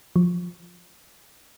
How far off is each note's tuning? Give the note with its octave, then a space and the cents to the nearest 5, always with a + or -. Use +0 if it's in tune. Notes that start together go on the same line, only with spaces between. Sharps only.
F3 +15